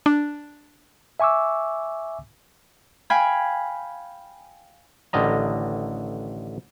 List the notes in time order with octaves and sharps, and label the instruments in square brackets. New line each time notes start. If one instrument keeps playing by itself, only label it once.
[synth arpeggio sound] D4
[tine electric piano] E5 G#5 C#6 D6 E6
[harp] F5 G5 G#5 B5
[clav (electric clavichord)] A1 D3 D#3 D#5 A#5